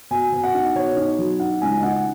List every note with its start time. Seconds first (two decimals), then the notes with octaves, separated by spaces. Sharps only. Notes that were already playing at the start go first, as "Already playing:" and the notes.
0.11 B2 G#5
0.32 B2
0.43 F#5
0.54 D#4
0.75 B2 C#5
0.97 D#4
1.18 F#3
1.40 D#4 F#5
1.61 C#2 G#5
1.77 D#5
1.83 D#4 F#5